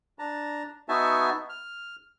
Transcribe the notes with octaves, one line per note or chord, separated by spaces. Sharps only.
D4 A5 A#5
B3 D#4 F#4 E5 G#5 A5
F6